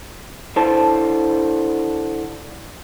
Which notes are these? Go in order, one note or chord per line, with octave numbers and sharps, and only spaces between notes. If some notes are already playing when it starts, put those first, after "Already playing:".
D3 E4 C5 A5